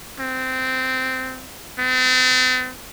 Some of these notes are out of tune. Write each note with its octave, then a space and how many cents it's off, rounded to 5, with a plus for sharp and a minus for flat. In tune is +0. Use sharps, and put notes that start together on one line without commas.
C4 -15
C4 -45